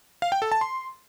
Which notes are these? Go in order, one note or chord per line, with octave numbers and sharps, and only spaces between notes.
F5
G5
A4
A5
C6